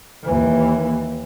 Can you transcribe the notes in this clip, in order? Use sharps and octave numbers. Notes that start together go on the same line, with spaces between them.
D#2 E3